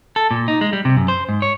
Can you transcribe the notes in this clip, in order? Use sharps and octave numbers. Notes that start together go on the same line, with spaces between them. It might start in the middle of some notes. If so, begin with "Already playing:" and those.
A4
A#2
D#4
G#3
G3
C3
F#2
C5
G#2
C#5